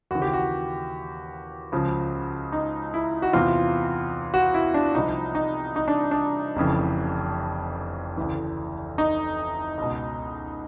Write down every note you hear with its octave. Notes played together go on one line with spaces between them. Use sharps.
D#2 C#3 E3 F#4
G4
F#4
C#2 C#3 F3
D#4
E4
F#4
E2 C3 E3 F4
F#4
E4
D4
C2 C3 F3 D#4
D#4
D#4
D4
D4
F1 F2 C#3 E3
D2 C#3 E3
D#4
C#2 B2